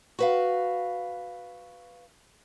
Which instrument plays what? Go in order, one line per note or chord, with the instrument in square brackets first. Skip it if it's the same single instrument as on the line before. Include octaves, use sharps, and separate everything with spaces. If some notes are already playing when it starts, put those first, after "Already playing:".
[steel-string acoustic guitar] F#4 B4 F5